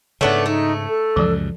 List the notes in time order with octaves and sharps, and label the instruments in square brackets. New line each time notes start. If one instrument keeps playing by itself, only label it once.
[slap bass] G#2 C#3 [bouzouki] A3 B3 D4 [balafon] C#5
[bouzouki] A3 [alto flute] D#4
[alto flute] A4
[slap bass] C#2 F#2 [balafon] E3 F3